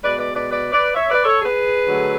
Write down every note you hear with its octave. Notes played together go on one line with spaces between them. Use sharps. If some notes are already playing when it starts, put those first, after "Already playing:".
B2 G#3 B4 D5
B4 D5
B4 D5
B4 D5
B4 D5
C#5 E5
B4 D5
A4 C#5
G#4 B4
D3 F#3 A3